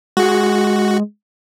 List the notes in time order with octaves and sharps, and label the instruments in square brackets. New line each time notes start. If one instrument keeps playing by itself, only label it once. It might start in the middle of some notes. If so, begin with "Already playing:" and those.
[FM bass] G#3 [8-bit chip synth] F#4